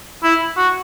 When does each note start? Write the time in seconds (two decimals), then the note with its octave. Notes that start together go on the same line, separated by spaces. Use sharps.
0.24 E4
0.57 F#4